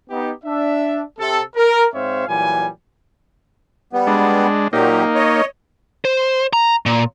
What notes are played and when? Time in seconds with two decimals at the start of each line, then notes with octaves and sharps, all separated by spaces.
0.10 B3 D#4 G4
0.44 D4 E5
1.19 C3 A4
1.56 A#4
1.94 G#2 C4 C5 C#5 E5 F5
2.28 A#2 E3 F#3 G3 G#5
3.93 G3 B3
4.07 G#3 D4
4.73 A#2 F#3 A#3 D#4 G4
5.15 C#5 D#5
6.05 C5
6.53 A#5
6.86 A#2